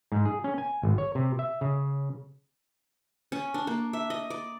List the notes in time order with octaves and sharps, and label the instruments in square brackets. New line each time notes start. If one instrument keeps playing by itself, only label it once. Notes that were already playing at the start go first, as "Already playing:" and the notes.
[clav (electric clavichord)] G#2
G#4
C#4
G#5
G#1
C#5
C3
E5
C#3
[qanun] C#4
D4
A#3
E5
D#5
D5